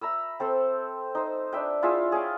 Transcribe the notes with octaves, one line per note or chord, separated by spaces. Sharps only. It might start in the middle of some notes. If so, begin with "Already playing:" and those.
E5 A#5 B5 E6
C4 A4 C5
D#4 C5
D4 B4 E5 G5
E4 F4 G#4 E5
G#4 C#5 F5 G5